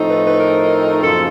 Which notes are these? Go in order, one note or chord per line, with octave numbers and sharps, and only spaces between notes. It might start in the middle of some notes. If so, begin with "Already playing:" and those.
Already playing: A2 F3 A3 C4 D#4
B4
B4
A#4
F#2 C#3 F3 A#3 A4